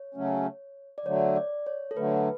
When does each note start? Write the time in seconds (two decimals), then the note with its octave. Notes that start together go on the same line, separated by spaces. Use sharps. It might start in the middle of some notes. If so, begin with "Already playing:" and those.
Already playing: C#5
0.14 C#3 F#3 A3 C#4
0.98 D5
1.05 D3 F#3 A3 C#5
1.36 D5
1.66 C#5
1.91 A4
1.97 D3 F#3 A3 B4